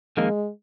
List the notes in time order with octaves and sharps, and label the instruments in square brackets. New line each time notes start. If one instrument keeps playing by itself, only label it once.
[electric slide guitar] F2 D#3 A#3 [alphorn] G#3